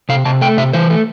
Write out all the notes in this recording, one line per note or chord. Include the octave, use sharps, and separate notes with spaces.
C3 F5
C3 A5
A3 G5
C3 E5
E3 C5
A3